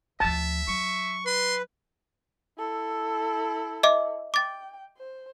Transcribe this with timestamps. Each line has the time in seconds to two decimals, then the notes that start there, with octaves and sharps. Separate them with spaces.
0.20 D2 F3 E5 A5
0.68 F#3 C#6
1.26 B4 C6
2.58 E4 A4
3.83 D#5 E5 D6
4.34 G5 D6 A6
4.98 C5